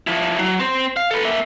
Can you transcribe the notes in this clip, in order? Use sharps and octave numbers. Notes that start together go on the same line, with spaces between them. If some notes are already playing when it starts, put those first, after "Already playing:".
F3 E4
F#3
C4 C5
F5
A4 B4
A#3 E5